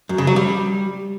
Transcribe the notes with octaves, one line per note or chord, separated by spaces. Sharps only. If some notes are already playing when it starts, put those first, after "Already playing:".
F#2
C#3
F#3
G3